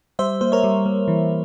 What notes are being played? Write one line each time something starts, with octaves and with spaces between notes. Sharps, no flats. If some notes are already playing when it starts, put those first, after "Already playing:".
G3 C5 E5
A#3 C5
A#4 C#5
G3
A#3
E3